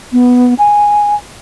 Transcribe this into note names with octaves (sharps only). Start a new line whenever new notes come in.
B3
G#5